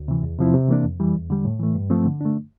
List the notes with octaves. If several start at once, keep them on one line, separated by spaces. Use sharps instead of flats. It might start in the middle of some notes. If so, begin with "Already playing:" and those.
Already playing: D2
C3 E3
E2
C3 F3 C4 E4
C3
E3 A#3 D4
F2
E3 G3
E2
D3 G3
A2
E3 A3
G2
F3 A3 C4
D3
A3 D4